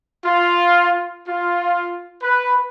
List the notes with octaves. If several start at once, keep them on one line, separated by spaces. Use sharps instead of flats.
F4
F4
B4